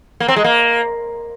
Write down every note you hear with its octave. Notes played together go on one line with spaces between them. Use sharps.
A#3
C4
G#3
A#3